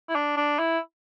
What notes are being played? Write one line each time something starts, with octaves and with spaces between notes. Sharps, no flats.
E4
D4
D4
E4